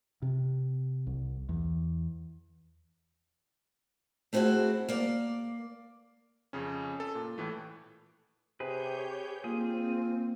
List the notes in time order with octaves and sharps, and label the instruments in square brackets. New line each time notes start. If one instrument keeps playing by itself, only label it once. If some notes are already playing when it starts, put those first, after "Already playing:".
[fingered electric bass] C3
C2
E2
[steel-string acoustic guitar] A3 C4 D#4 E4 F#4 G#4
A#3 D5
[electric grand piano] F2 C#3 C#4
A4
A#2
A2 E3 A3
[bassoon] C3 [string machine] G4 C#5 G6 [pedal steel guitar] G#4 B4
[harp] A#3 D4 [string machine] C4 [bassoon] F4 [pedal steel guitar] G#4